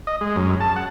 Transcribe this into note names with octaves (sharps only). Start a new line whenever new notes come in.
D#5
G#3
F#2
A5
F#5